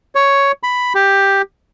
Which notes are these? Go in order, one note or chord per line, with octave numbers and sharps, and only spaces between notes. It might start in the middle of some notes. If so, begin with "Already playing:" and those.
C#5
B5
G4